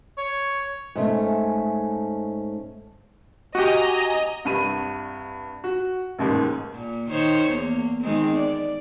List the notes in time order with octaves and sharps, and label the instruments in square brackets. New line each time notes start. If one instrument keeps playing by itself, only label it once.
[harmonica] C#5
[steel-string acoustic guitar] G#2 A3 C#4
[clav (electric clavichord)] F#4 G4 [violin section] D#5 G#5 A#5
[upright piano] C2 G2 B5 D#7
F#4
A1 D#2 G#2
[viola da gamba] A#2
D#3 C5 C#5
E2 A#3
D#3 G#3 C4
D5